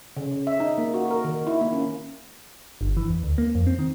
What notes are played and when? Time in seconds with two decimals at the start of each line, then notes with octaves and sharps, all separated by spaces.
0.17 C#3
0.32 C#3
0.47 E5
0.60 D#4
0.78 A#3
0.94 F#4
1.11 A#4
1.24 D#3
1.47 E4
1.61 A#3
1.73 C#4
2.81 G1
2.97 E3
3.10 E2
3.23 D2
3.38 A#3
3.55 F2
3.67 C4
3.79 D#3